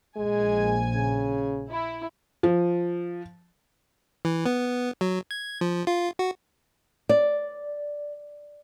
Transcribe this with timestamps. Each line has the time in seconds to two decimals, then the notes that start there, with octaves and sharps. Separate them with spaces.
0.16 A#1 G#3 G#5
0.95 C#3
1.69 E4
2.43 F3
4.25 E3
4.46 B3
5.01 F#3
5.31 G#6
5.61 F3
5.87 F4
6.19 F#4
7.09 D5